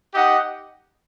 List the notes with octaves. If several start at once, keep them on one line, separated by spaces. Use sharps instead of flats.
D#4 G4 D#5 F#5